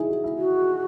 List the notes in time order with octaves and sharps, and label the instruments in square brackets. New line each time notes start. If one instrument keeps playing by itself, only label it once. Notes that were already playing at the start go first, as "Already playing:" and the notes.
Already playing: [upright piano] D#4 E4 G#4
F#4
E4
[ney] F#4